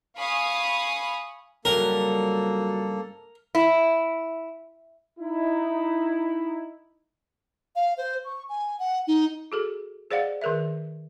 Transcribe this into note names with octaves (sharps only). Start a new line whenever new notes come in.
F5 G#5 B5 C#6 D#6
G2 C#3 F3 F#3 A#3 G4 A4 A#4
E4
D#4 E4
F5
C5
C#6
G#5
F#5
D#4
F#4 G#4 A4
G#4 C5 D5 D#5 F5 F#5
D#3 G#4 A#4 C#5 E5